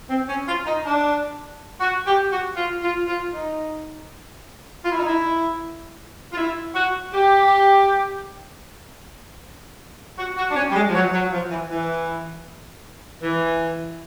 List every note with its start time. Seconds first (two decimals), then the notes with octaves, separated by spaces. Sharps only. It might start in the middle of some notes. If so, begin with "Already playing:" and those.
0.09 C4
0.28 C#4
0.48 F4
0.66 D#4
0.85 D4
1.80 F#4
2.07 G4
2.32 F#4
2.56 F4
2.83 F4
3.08 F4
3.33 D#4
4.85 F4
4.92 E4
4.99 D#4
5.07 E4
6.32 F4
6.37 E4
6.75 F#4
7.13 G4
10.18 F#4
10.37 F#4
10.51 D4
10.56 C#4
10.70 G3
10.75 G#3
10.88 F3
10.94 F#3
11.13 F#3
11.32 F3
11.51 E3
11.70 E3
13.22 E3